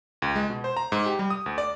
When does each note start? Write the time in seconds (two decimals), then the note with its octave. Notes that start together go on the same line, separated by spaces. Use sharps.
0.22 C#2
0.36 G#3
0.50 B2
0.64 C5
0.77 A#5
0.92 G#2
1.06 G4
1.19 G3
1.30 D#6
1.46 D2
1.58 D5